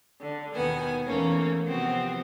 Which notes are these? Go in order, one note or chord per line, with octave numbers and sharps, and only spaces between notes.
D3
D#2 B2 D#3 B3 G#5
E2 E3 A3 A#3 C#4
C3 F3 B3 C4 F#4